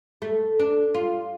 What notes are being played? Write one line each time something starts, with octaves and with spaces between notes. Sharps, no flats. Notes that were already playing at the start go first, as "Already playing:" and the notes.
A3
D4
F4